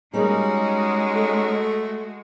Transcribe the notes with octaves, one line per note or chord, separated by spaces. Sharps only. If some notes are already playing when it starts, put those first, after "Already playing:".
G3 G#3 A#3 C#4 D#4 F#4 G#4
A3